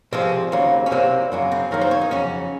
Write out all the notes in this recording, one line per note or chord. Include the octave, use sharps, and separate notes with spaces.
C2 C3 F3 G#3 C4
D#2 C#3 F#3 A#3
C#4
C2 C3 F#3 A#3 C4
F#2 C#3 F#3 A#3
C4
F#2 D#3 F#3 A#3 A#4
C5
C#5
D#4
F2 C#3 F#3 C#4